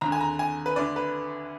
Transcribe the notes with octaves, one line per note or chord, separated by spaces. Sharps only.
D#2 D3 A#5
G#5
A#5
G#5
B4
D2 D3 D5
B4